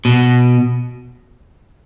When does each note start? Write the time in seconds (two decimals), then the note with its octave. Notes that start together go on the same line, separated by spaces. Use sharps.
0.05 B2